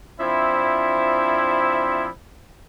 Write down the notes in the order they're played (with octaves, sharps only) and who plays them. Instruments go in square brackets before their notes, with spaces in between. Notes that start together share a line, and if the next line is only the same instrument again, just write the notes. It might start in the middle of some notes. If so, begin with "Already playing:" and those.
[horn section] F3 C4 D4 E4